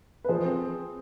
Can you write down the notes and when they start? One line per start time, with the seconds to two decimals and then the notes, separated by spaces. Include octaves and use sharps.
0.24 B4
0.29 F3 G#4 C5
0.45 C4